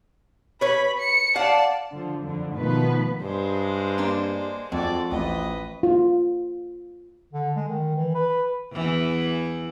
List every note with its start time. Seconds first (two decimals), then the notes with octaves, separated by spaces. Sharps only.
0.61 B4 C#5 B5
1.00 C#7
1.36 D5 F5 F#5 A5
1.92 D3 F3
2.23 F2 D3
2.56 B2 D#3 F3 A3 B3 B4
3.22 G2 G#3 C5
3.98 A#3 C4 D4
4.72 F2 F3 G#3 F#4 D5
5.11 A1 B4 D#5
5.83 F4
7.33 D3
7.56 G#3
7.69 D#3
7.96 E3
8.15 B4
8.72 E2 E3